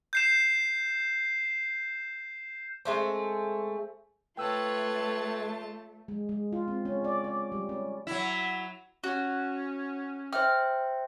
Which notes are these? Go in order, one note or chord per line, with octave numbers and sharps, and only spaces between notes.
G6 C7 E7
G#3 A3 C4
A3 F4 B4 C#5 G5 A5 E6
G#3
G#3
F4
C4
C#4
D5
D5
G3
C#4
F#3 E4
C#4 F#4
C5 E5 G5 F6